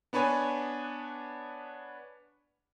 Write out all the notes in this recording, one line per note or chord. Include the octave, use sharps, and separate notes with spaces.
B3 D4 B4 C#5 G#5